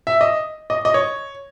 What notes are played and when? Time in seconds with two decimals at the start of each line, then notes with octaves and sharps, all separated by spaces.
0.07 E5
0.21 D#5
0.70 D#5
0.85 D#5
0.94 C#5